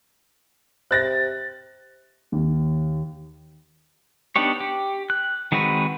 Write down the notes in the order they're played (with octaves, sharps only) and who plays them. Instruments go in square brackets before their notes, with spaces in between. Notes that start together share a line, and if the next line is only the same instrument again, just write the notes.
[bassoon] C3 [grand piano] F#6 A6 A#6
[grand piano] D#2
[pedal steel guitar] B3 D4 D#4 G4 C#5
G4
F#6
D#3 G#3 C4 F#4 B4